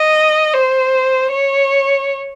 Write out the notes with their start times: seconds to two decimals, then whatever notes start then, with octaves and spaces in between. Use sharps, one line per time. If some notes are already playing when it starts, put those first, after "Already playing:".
Already playing: D#5
0.53 C5
1.31 C#5